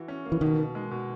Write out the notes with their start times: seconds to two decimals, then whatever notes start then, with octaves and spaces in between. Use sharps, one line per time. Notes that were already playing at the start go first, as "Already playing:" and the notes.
Already playing: E3 F#4
0.08 C#4
0.25 A#3
0.32 E3
0.41 B2 D#3
0.59 B2
0.75 G#3
0.91 B2